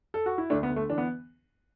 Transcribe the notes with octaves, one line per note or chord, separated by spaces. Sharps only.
A4
F#4
E4
D2 A3 D4
B3
D3
A3
E3 D4
B3